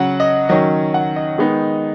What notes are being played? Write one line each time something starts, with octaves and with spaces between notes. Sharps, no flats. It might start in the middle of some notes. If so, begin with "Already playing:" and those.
Already playing: C#3 F#3 C#4 F#5
D#5
D#3 F#3 C#4 D#5
F#5
D#5
D#3 G#3 B3 D#4